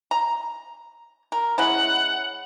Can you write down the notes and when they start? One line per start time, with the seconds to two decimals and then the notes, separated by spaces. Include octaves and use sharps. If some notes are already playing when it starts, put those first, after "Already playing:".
0.11 A#5
1.32 A#4
1.58 G#3 C#4 E4 F#5